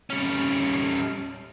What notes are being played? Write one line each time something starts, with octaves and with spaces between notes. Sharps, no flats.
G3 C#4